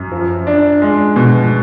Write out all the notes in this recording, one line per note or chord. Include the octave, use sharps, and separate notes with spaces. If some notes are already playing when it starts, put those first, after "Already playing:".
Already playing: F#2
F3
D4
G#3
B2